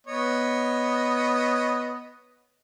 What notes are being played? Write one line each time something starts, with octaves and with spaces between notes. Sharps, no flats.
B3 C#5 D#5